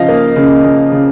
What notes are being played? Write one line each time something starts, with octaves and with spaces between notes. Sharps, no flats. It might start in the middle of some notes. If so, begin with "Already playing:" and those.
Already playing: C#3 F3 D#4 D#5 F5
A#3
C#3
C#3
C#3